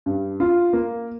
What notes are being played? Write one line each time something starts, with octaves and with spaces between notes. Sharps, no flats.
G2
F4
A#3